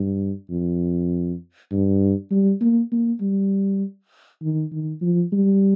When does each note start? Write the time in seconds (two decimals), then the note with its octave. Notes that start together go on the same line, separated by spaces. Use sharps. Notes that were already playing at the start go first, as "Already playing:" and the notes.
Already playing: G2
0.50 F2
1.71 G2
2.31 G3
2.61 A#3
2.92 A#3
3.21 G3
4.42 D#3
4.72 D#3
5.01 F3
5.33 G3